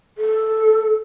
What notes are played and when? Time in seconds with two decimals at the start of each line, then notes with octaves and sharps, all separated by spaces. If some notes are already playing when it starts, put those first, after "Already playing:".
0.18 A4